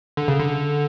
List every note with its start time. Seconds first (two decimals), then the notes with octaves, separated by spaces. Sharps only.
0.17 D3
0.28 C#3
0.39 D3